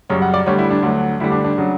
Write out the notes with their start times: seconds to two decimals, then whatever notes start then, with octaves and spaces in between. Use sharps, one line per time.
0.10 F#2 C#3 G3 C#5
0.22 F#5
0.34 D5
0.46 D2 D3 G3 C#5
0.58 E4
0.70 D4
0.83 D2 D3 F#3
1.20 D2 D3 G3 E4
1.32 D4
1.44 D4
1.58 C#3 F#3